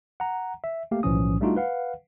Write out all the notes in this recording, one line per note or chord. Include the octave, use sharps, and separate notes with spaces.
F#5 A#5
E5
A3 A#3 G4 F5
B1 A2 E3 F3 C#4 D#6
G3 A3 D4 D#4 F4 F#4
B4 F5 F#5